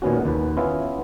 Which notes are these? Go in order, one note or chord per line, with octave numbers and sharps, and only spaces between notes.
A#2 D#3 B3 C#4 F#4
D#2 B4
B3 C#4 E4 F4